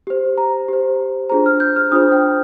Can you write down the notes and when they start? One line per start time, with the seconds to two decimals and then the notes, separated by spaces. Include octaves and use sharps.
0.07 G4 C5
0.38 A#5
0.68 G4 C5
1.29 D4 F4 G#4 C5 A#5
1.46 F6
1.60 G6
1.76 F6
1.92 D4 F4 G#4 C5 D#6
2.12 G5